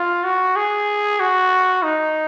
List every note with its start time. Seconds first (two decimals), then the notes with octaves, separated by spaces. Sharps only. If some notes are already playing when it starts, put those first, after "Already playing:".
Already playing: F4
0.24 F#4
0.56 G#4
1.20 F#4
1.83 D#4